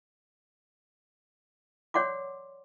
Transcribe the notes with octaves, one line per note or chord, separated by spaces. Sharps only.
C#5 D5 F#5 C6 D6